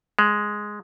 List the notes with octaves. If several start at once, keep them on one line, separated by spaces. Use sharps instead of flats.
G#3